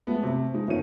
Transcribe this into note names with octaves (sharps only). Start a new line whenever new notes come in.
F3 G#3 A3 B3 B4
C3 A3
F3 G#3 D#4
G1 D#3 F3 C#4 F#4 D#7